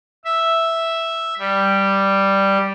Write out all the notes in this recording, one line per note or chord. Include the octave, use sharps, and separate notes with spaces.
E5
G3